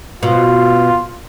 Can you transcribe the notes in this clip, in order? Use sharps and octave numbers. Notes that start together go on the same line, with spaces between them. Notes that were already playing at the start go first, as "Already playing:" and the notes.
B2 F4